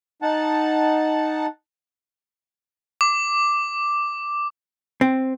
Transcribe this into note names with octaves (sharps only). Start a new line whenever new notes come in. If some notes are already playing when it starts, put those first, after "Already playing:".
D#4 F#5 A5
D6
C4